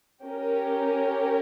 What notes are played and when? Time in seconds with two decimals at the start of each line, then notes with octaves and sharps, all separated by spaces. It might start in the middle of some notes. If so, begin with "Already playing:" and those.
0.24 C#4 G4 A#4